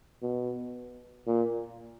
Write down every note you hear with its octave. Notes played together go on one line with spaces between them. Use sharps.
B2
A#2